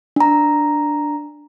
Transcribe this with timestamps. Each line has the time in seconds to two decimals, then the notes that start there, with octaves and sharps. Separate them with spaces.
0.16 D4 A#5